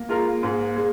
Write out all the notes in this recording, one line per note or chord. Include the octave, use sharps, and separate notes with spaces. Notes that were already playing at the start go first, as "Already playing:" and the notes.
Already playing: A#3
G#3 F4 A#4
G#2
G#3